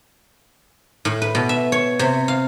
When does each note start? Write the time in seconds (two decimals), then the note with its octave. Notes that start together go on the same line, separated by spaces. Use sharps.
1.05 A2
1.22 B4
1.35 B2
1.49 E5
1.72 C#5
1.99 C3
2.28 F5